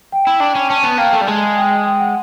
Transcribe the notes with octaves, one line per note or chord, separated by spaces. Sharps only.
G5
E4
D4
C#4
C#4 A5
B3 A5
A#3 G5
A3 A5
G3
G#3
G5
G#5
G5
F#5